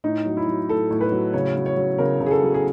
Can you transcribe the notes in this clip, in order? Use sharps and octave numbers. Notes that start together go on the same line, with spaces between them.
A2 D#4
F#3
E4
F#3
A2 A4
A2
B4
F#3
C#3 C#5
F#3
C#5
F#3
C#3 A#4
C#3
G#4
A4
F#3
G#4